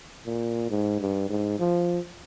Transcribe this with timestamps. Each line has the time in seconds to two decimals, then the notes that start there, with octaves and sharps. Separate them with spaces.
0.26 A#2
0.70 G#2
1.00 G2
1.30 G#2
1.59 F3